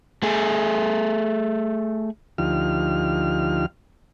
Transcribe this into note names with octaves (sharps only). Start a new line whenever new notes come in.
A3 G#4
D2 F3 D#4 F4 G4 F6